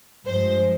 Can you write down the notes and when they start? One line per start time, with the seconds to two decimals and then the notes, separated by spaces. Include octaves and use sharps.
0.25 G2 F3 G#3 C5